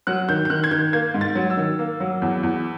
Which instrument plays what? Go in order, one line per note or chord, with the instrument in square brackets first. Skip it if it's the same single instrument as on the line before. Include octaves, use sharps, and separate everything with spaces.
[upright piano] F#3 F#6
D#3 G6
G6
D#3 F#6
G#6
D#3 G6
A#3 G#6
G#2
A6
F#3
E6
D#3
A#3
F#3
E2
E2